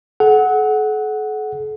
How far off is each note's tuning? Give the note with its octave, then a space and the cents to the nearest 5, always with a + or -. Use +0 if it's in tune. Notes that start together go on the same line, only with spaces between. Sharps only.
A4 -45 F#5 +0